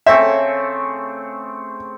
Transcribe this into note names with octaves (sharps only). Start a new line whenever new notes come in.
C#3 A3 C4 E5